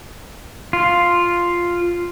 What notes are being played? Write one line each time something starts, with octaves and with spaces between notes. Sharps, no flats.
F4